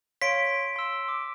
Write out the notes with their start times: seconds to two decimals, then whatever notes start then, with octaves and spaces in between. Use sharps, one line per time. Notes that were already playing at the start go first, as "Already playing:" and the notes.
0.22 C#5 F5 C6 B6 D7
0.76 C6 E6
1.08 D6